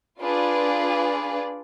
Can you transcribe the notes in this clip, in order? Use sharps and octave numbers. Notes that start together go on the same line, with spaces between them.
D4 F4 G#4 B4 D5